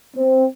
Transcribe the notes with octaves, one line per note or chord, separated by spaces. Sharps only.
C4